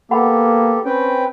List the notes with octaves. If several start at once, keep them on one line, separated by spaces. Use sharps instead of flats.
A#3 B3 G4 A4 F#5 B5
C4 C#4 B4 G5